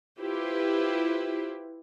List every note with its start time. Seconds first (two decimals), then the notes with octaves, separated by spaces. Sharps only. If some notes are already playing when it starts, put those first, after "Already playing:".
0.20 E4 F4 G4 B4 C5